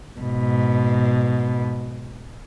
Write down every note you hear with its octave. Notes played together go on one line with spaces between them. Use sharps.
G#2 B2